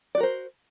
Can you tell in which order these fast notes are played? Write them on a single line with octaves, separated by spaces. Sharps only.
D5 F#4 A#4 C5